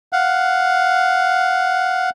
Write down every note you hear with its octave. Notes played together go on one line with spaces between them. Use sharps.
F5 F#5